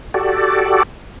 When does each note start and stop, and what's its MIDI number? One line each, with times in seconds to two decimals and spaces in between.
0.14 0.83 66
0.14 0.83 67
0.14 0.83 69
0.14 0.83 74